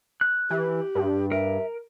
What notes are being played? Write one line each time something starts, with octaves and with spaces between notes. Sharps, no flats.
F#6
E3 G4
G2
A#4 E5